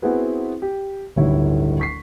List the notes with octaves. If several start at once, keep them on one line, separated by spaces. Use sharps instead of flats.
B3 C4 E4 F#4 G#4 B4
G4
D1 G1 D#3 G3 E4 C#5
C#6 B6 C7